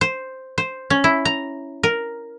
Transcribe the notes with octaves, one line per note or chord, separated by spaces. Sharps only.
C5
C5
C#4
E4
A#5
A#4